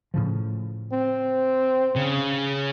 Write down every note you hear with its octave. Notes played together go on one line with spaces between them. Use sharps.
A2 C#3 F3
C4
C#3